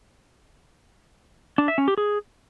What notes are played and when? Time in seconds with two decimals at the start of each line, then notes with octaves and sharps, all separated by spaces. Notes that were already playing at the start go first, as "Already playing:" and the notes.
1.58 D4
1.68 E5
1.78 C#4
1.88 G4
1.98 G#4